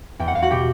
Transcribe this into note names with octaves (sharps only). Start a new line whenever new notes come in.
E2 G5
F#5
E2 F5
F#4 F#5
B2 G4 G5